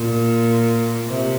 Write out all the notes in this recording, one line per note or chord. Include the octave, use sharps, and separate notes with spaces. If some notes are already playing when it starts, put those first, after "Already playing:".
Already playing: A#2
C3